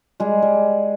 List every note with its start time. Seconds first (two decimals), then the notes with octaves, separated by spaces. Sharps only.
0.20 G3 G#3 G#4
0.42 G3